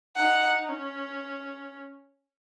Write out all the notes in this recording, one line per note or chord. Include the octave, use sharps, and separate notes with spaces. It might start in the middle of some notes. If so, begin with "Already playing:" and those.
D#4 F#5
C#4